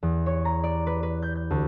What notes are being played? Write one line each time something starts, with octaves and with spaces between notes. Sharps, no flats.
E2
C#5
A#5
D5
B4
B4
G6
G6
D2